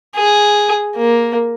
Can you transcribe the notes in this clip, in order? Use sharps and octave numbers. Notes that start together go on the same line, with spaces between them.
G#4
A#3